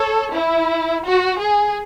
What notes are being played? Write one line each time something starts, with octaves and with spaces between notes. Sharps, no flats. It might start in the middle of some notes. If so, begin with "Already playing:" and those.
Already playing: A4 C#5
E4
F#4
G#4